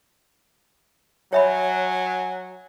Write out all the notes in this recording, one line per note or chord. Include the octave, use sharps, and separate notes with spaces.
F#3 C#5 E5 G#5 B5